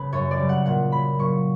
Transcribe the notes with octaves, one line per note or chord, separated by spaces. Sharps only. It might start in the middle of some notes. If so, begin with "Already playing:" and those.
Already playing: C#3 B4
F#2 C#5
D5
C#3 G3
F#5
A#2 F#5
F#3 B5
A#2 C#6